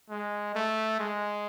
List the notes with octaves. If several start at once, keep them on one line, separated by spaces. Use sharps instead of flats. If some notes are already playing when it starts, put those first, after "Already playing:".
G#3
A3
G#3